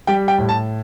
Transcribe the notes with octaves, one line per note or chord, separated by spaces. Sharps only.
G3 G5
G5
A2
A5